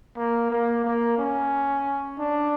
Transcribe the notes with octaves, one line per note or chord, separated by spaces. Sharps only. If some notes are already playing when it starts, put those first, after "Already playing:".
A#3
A#3
A#3
C#4
D4